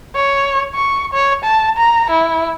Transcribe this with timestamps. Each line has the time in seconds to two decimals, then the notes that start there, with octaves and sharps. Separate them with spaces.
0.15 C#5
0.75 C#6
1.13 C#5
1.44 A5
1.77 A#5
2.11 E4